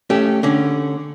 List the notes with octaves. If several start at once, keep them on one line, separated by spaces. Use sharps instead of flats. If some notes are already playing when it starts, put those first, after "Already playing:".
A3 C#4 G4
D3 C#4